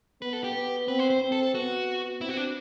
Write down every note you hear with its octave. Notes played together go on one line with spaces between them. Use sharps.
B3 B4
A4
G4
B3
C4 B4
C5
C5
C4
A4
A4
B3 F#4
C4 E4
F#4
D4